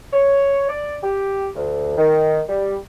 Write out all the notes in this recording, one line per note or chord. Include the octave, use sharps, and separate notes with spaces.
C#5
D5
G4
D2
D#3
G3